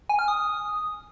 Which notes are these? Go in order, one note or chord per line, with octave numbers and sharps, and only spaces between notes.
G#5
F6
D#6